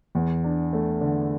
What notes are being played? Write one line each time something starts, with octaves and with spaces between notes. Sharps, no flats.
E2
D4
A3
D3